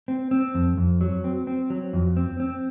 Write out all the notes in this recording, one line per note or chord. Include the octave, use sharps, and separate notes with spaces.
C4
C4
F2
F2
F#3
C4
C4
F#3
F2
C4
C4